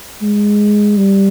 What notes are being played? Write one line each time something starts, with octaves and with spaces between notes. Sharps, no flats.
G#3
G3